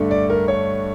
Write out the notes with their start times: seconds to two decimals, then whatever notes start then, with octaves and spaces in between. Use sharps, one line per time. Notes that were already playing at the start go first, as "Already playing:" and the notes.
Already playing: G2 D3 A3 D4
0.11 D5
0.30 A#4
0.48 C#5